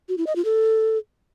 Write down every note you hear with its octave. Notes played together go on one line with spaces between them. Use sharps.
F#4
E4
D#5
F4
A4